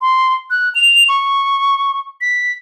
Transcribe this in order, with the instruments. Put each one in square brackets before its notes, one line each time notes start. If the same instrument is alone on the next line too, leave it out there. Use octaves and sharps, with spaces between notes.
[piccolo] C6
F#6
F7
C#6
B6